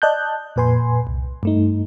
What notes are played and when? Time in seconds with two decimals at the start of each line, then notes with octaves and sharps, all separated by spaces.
0.02 D5 D#5 A5 F#6 G6
0.56 F2 A#2 B4 G#5 C6
1.07 C2
1.43 G2 A3 D#4